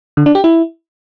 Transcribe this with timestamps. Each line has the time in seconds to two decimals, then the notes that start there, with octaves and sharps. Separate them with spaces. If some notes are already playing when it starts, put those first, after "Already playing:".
0.17 D3
0.26 D4
0.35 G4
0.44 E4